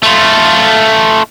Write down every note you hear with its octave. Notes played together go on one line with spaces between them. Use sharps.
A3 F4